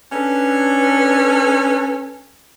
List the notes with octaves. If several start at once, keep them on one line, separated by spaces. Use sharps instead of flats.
C#4 D4 A4 B4